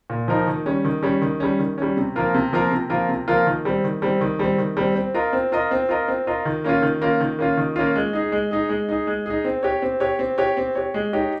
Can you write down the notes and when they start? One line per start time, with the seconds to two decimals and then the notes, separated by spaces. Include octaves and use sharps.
0.10 A#2
0.28 F3 A#3 D#4 A#4
0.47 D#3
0.66 G3 C#4
0.85 D#3
1.03 G3 C#4
1.22 D#3
1.40 G3 C#4
1.59 D#3
1.78 G3 C#4
1.97 C3
2.16 F3 A#3 F4 A#4
2.34 C3
2.53 F3 A#3 F4 A#4
2.71 C3
2.90 F3 A#3 F4 A#4
3.09 C3
3.28 F3 A#3 F4 A#4
3.46 D#3
3.65 G3 C4
3.84 D#3
4.02 G3 C4
4.21 D#3
4.39 G3 C4
4.58 D#3
4.77 G3 C4
4.95 C4
5.14 F4 A#4 D#5
5.33 C4
5.52 F4 A#4 D#5
5.71 C4
5.89 F4 A#4 D#5
6.08 C4
6.27 F4 A#4 D#5
6.45 D#3
6.64 A#3 C#4 F4
6.82 D#3
7.02 A#3 C#4 F4
7.20 D#3
7.39 A#3 C#4 F4
7.57 D#3
7.76 A#3 C#4 F4
7.95 G#3
8.13 D#4 G#4
8.32 G#3
8.51 D#4 G#4
8.69 G#3
8.89 D#4 G#4
9.07 G#3
9.26 D#4 G#4
9.45 C4
9.63 G4 C#5
9.82 C4
10.00 G4 C#5
10.19 C4
10.38 G4 C#5
10.57 C4
10.75 G4 C#5
10.94 G#3
11.13 D#4 G4 C#5